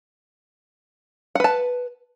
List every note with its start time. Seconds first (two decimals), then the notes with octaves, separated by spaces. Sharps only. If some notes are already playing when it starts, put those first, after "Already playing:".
1.35 F#5
1.40 B4
1.44 A5